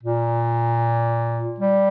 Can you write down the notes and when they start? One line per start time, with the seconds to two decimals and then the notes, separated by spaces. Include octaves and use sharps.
0.04 A#2
1.60 G3